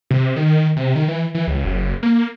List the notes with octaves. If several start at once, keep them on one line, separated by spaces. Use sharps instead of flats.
C3
D#3
C3
D#3
E3
E3
C#2
F#1
A#3